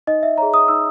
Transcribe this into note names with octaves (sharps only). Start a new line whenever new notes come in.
D#4 D#5
E5
G#4 C#5 A#5
D#6
D#4 E6